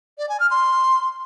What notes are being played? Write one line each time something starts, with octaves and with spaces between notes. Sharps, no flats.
D5
G#5
F6
C6